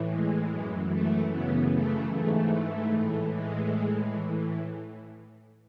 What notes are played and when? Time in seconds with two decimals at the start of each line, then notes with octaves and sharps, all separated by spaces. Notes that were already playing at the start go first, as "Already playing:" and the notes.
Already playing: A2 E3
0.10 G#3
0.51 F#2 E3
0.92 A3
1.33 F#2 C#3 E3 B3
1.74 A3
2.14 G#2 E3 A3
2.96 A2 E3
3.37 G#3
3.78 A2 E3